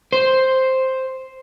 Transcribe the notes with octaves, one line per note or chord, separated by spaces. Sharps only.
C5